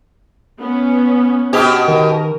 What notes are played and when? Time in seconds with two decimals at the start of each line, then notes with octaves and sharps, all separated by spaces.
0.61 B3 C#4
1.53 B2 G4
1.88 D#3 A#4